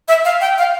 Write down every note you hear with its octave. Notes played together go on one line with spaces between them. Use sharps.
E5
F5
G5
F5